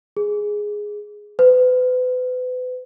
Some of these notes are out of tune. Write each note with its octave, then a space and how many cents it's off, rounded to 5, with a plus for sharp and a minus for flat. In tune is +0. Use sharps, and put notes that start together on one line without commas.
G#4 +0
B4 +35